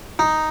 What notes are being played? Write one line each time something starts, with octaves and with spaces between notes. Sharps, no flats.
D#4